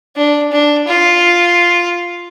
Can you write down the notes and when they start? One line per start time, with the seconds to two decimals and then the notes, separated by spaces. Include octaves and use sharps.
0.16 D4
0.51 D4
0.87 F4